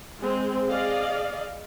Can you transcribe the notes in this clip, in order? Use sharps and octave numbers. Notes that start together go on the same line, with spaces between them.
G#3 C4
G#4 D5 D#5 F5